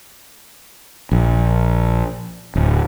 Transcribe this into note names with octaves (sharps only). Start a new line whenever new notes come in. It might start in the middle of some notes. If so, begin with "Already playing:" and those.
A#1
D1